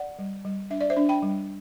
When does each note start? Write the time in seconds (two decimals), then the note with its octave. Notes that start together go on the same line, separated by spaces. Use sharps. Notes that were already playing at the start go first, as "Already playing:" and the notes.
Already playing: D5 F#5
0.19 G3
0.44 G3
0.70 D4 E5
0.81 D5
0.90 C5 E5
0.96 D4
1.09 G5 B5
1.22 G3